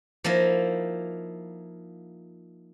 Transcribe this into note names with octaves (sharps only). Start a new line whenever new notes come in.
F3 A#3 D#4 E4